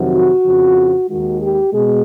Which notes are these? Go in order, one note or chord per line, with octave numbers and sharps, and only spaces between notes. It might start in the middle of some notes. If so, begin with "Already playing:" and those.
Already playing: F2 C3 D#3 F#3 F#4
F2 C#3 F3
D#2 D#3 G#3 F#4
G4
B2 G#3 G#4